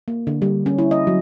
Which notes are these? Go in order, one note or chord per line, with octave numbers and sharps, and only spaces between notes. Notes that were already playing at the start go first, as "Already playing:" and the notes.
A#3
D3
G3
C#4
E4
D#5
F#3